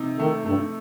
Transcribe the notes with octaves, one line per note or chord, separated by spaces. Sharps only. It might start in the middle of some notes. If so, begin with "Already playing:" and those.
Already playing: C3 D#4
D#3 A3
G2 A3